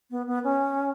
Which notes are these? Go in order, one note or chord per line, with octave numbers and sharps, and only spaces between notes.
B3
B3
C#4